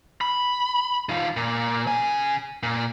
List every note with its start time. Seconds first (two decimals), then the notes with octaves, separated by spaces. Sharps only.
0.21 B5
1.09 D#3 F4
1.37 A#2
1.87 C#3 G#5
2.63 A#2